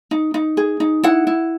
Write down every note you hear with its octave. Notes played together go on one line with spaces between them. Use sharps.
D#4
D#4
G#4
D#4
E4 F#5
E4